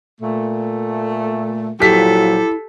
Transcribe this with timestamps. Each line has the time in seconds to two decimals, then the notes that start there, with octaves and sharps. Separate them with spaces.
0.20 A#2 A3
1.80 A#2 F3 F#3 E4 G4 A4 B6